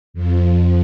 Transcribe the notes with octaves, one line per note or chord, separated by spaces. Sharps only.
F2 F3